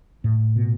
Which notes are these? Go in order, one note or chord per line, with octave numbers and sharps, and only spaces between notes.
A2
B2